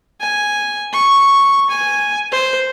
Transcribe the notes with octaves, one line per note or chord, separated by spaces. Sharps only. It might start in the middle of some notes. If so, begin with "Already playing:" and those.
G#5
C#6
G#5
C5